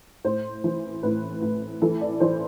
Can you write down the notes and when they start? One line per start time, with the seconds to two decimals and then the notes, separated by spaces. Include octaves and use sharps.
0.24 A2 C5
0.64 E3
1.03 A2 B4
1.42 A2
1.82 E3 A4
2.01 D5
2.20 E3 C5